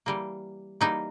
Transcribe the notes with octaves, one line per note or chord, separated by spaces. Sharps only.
E3 G3 A#3
E3 G3 A#3 D#4